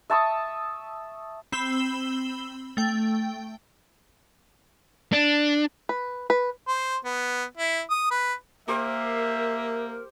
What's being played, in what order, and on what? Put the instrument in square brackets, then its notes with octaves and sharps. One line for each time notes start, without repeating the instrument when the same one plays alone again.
[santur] E5 A5 C#6 D#6
[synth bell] C4 B5 E6 E7 G7
A3 G5
[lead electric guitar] D4
[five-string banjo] B4
B4
[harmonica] C5
B3
E4
D#6
B4
[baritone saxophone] A#3 [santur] G4 C5 [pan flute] A#4 [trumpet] E5